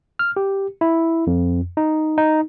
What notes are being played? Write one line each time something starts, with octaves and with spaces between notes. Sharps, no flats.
F6
G4
E4
F2
D#4
D#4